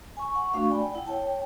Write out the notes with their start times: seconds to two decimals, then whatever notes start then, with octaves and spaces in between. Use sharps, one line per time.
0.17 G#5 C#6
0.31 F#5 C#6
0.53 A3 D4 F#4 F5 C#6
0.69 D5 G5 G#5 B5
0.91 E4 F#5 G5
1.06 C#5 G5 A5